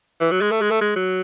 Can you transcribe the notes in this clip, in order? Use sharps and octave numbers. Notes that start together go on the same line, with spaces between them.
E3
F#3
G#3
A3
G#3
A3
G#3
F#3